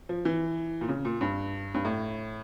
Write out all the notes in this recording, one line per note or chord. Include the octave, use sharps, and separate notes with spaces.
F3
E3
A#2
C#3
A#2
G2
G2
A2